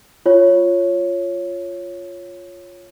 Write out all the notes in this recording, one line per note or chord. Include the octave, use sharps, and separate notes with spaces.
F4 C#5